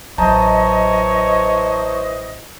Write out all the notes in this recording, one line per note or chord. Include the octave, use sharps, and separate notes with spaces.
A1 E3 F#3 C5 C#5 D#5 A5 A#5